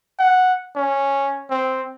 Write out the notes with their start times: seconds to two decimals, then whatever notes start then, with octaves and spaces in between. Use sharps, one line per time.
0.19 F#5
0.76 C#4
1.50 C4